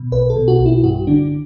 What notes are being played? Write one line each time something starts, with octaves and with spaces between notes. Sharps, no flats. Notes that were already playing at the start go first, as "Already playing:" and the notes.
Already playing: B2
B1 B4
A4
B2
F#4
B1
E4
G2 F#4
D3 D4